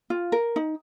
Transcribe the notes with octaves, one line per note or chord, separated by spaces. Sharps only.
F4
A#4
D#4